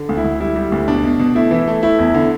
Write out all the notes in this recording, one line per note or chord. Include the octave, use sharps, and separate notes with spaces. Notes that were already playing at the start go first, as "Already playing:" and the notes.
Already playing: D3
D2
E4
D2
G3 E4
G3
D2
B2 D4
B2
B2
A3 E4
E3
A3
A3 E4
E2
D3